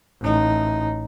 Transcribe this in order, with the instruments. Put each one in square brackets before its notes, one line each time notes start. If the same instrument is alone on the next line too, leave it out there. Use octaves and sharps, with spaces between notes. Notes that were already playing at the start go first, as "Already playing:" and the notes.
[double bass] A1 D#4